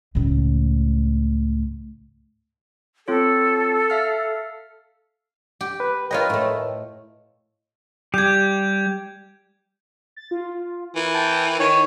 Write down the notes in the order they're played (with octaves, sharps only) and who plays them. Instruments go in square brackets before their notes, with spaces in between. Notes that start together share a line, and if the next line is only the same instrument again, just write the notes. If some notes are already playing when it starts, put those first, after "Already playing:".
[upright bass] C#2 A2
[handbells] C4 F4 C#5 [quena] A4
[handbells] E5 F5 F6
[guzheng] G4
[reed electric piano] B4
[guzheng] F4 C#5 D#5 [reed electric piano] A#4 B4 G5
[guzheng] A2 A3
[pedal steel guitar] G3 G4 [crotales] G6 G#6
[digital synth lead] A6
F4
[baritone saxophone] E3 [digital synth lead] A#4
[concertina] G5 A5
[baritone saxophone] D#3 [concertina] C#5